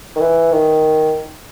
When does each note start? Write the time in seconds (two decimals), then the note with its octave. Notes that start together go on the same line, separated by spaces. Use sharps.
0.16 D#3
0.21 E3
0.52 D#3